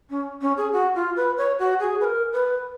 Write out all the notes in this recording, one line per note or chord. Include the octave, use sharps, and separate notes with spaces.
C#4
C#4
G#4
F#4
F4
B4
C#5
F#4
G#4
B4
A#4
B4